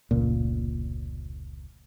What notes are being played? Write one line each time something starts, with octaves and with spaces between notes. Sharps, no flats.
F1 C#2 A#2